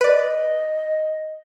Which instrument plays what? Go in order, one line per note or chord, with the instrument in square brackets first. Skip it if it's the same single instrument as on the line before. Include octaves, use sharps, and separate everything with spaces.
[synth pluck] B4 D5 [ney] D#5